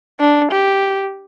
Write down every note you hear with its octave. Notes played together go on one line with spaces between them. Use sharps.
D4
G4